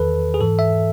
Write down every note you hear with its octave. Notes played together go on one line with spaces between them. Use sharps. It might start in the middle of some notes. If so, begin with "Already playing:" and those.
Already playing: E2 D#3 A4 B4
G#4
G#2 E3 A4
E5